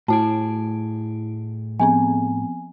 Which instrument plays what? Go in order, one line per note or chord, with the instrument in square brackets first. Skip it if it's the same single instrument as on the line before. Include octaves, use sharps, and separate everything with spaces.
[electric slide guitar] A2 G#4 [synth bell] A3 E4 D7 [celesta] A5
[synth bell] F3 B3 C4 [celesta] G#5